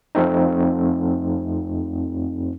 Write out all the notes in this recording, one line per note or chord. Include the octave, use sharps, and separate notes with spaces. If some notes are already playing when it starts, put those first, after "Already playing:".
F2 F3 A3 C4 D#4